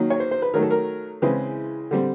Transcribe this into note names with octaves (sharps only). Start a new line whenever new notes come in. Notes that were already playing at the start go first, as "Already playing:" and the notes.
Already playing: D#3 F#3 A#3
C#5
C5
C5
B4
D#3 F#3 A3 A#4
A4
A#4
C#3 E3 G#3 C4 B4
D3 G3 C4